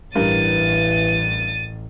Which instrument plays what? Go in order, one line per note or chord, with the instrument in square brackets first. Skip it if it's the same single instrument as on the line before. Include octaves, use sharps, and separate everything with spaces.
[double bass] A1 [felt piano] G2 A#4 [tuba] E3 [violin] A6 D#7